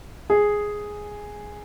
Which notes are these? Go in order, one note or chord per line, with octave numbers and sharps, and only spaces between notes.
G#4